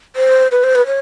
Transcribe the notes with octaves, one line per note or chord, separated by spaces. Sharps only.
C5
B4
C5
B4
C#5